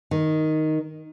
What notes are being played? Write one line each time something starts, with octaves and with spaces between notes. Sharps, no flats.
D#3